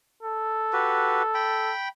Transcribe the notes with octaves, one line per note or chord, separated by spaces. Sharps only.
A4
F#4 G4 B4
G5 B5